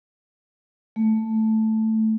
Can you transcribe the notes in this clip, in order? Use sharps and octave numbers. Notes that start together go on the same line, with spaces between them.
A3